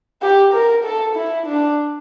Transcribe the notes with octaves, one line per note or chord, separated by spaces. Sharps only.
G4
A#4
A4
E4
D4